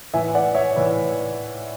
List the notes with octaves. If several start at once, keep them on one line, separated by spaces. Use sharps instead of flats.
A2 E3 E5 G#5
D5 F#5
C#5 E5
A2 E3